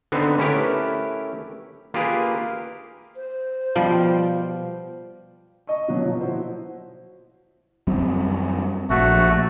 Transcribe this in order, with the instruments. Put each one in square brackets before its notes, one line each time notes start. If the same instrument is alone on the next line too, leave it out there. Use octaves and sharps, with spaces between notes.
[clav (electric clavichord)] D3 B3 C4 D#4
A3 C#4 E4 G4 A#4 B4
A#3 F4 G4 G#4 A#4 B4
[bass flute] C5
[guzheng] B2 F3 G3 [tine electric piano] F4 F5
[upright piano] D#5 C#6
B2 F3 F#3
A#2 F3
E4 F#4 C5
[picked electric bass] F#2 G3 C4
[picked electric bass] A#1 [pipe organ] A3 F#4